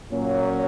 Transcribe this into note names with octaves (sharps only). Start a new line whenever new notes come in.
A#2 F#3 A#3 C#4